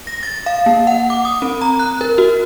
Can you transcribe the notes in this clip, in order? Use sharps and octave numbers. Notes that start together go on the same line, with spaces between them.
A#6
A6
F5
A#3
F#5
D6
D#6
C4
A#5
F#6
A#4
F#4